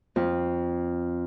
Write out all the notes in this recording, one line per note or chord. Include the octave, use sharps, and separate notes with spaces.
F2